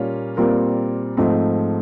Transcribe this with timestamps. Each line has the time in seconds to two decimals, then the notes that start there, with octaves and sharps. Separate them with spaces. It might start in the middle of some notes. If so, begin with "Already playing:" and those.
Already playing: A#2 G3 A#3 C#4 F4
0.37 A#2 G3 C4 F4 A#4
1.17 G#2 F3 A3 C4